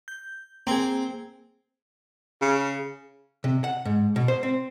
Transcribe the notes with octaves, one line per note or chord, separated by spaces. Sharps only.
G6
A#3 C4 G#4
C#3
C3
F#5
G#2
B2
C5
C4